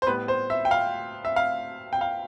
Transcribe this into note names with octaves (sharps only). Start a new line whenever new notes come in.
C5
A2 G3 B3 B4
C5
E5
G5
F5
E5
F5
G5
F5